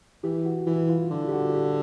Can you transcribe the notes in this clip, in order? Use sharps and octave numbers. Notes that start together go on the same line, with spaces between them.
E3 G4
F#4
E3 E4
F4
D3 F4
G4
F#4
G4